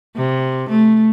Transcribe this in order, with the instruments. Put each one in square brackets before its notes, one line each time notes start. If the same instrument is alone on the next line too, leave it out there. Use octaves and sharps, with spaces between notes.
[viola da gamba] C3
A3